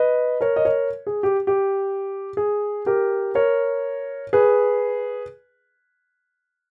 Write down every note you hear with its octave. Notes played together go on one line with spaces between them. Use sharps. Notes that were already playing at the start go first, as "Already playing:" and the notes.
Already playing: B4 D#5
A#4 C#5
D#5
A#4 C#5
G#4
G4
G4
G#4
G4 A#4
A#4 C#5
G#4 B4